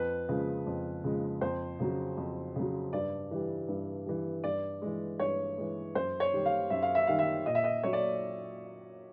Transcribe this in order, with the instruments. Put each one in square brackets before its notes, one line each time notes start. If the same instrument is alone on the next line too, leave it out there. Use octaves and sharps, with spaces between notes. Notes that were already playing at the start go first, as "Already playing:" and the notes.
Already playing: [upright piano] F2 B4
C#3 F3 G#3
F2
C#3 F3 G#3
F2 C5
C#3 F#3
F2
C#3 F#3
G2 D5
E3 G3
G2
E3 G3
G2 D5
E3 G#3
G2 C#5
E3 G#3
F#2 C5
C#5
D#3 G3
F5
F#2 E5
F5
E5
D#3 G3 F5
E5
A#2 D#5
E5
D#5
F#3 C#5
D5